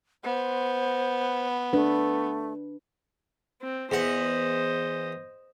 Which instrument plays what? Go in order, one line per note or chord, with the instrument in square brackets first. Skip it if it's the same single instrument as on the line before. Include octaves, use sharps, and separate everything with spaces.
[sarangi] B3 [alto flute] C5
[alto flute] A3 [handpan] D4 B4
[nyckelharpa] C4
[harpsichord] E2 F#5 [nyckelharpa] C5 D#5